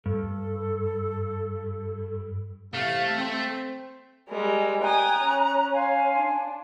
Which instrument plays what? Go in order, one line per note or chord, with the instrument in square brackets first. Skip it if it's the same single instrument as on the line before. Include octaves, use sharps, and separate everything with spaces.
[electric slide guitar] G2 [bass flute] A4
[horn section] C3 E3 F5 [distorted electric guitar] A3
[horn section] C4
[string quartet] G3 G#3 A#4
[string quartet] G5 G#5 D#6 [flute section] A#5 F#6
[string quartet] C#4
[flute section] F5 G#5 C6
[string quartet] D4